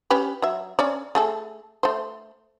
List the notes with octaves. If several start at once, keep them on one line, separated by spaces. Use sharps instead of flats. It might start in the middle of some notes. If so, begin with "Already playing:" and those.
C#4 G4 B4
F#3 E5
C#4 C#5 D5
A3 G#4 A4
A3 C5